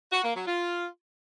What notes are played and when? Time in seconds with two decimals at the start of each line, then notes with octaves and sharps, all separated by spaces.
0.12 F#4
0.24 A#3
0.35 F#3
0.47 F4